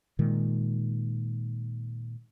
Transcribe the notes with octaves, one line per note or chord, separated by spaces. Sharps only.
A#2 D#3 G#3